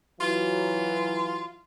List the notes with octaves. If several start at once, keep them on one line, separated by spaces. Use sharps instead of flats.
E3 F#3 F4